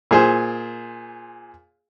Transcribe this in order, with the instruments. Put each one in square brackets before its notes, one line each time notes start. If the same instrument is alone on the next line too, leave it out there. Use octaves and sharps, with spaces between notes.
[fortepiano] A#2 G#4 C5